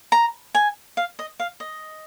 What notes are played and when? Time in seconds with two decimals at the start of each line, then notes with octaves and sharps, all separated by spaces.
0.12 A#5
0.55 G#5
0.97 F5
1.19 D#5
1.40 F5
1.60 D#5